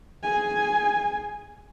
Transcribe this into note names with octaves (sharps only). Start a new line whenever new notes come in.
G#4 G#5